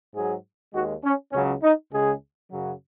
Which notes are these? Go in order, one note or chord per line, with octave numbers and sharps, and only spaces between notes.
G#2 F#3 G#4
D#2 D#3 G#3 F#4
C#4
C#2 C#3 F#3 C#4
D#4
C#2 C#3 G#3 G#4
F#2 C#3 F#3